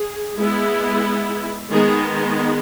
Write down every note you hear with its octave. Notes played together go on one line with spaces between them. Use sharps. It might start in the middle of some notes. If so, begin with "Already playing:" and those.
Already playing: G#4
G#3 B3 E4
D#3 G#3 B3 G#4